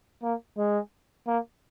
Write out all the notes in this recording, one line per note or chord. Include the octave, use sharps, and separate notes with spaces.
A#3
G#3
A#3